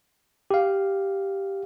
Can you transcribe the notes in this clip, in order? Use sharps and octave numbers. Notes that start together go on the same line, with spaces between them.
G4 F5